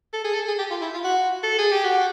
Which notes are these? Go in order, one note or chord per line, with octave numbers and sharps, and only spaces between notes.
A4
G#4
A4
G#4
G4
F4
E4
F4
F#4
A4
G#4
G4
F#4